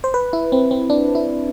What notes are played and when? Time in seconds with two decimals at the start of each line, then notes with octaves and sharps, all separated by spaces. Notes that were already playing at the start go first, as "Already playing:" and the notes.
0.04 C5
0.14 B4
0.33 E4
0.52 C4
0.71 C4
0.90 D4
1.15 E4